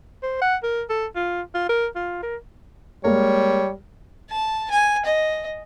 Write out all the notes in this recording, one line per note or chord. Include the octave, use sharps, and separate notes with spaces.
C5
F#5
A#4
A4
F4
F4
A#4
F4
A#4
G3 G#3 A#3 A#4 C#5
A5
G#5
D#5